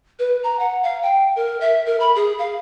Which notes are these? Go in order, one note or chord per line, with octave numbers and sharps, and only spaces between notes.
B4
A#5
F#5
F5
G5
A#4
E5
A#4
B5
G#4
F5